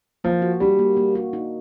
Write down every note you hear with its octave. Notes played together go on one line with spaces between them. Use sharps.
F3 A#3
F#4
G3 D4
A#3
A#3
F#4
D#4